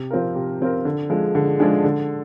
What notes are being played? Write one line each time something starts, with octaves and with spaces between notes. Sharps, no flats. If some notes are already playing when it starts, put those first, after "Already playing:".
Already playing: C3
F3 C4 F4 A#4
C3
F3 C4 F4 A#4
D3
F3 G#3 D4 G#4
D3
F3 G#3 D4 G#4
D3